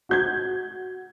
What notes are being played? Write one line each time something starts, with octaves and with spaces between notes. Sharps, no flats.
F#4 G6 G#6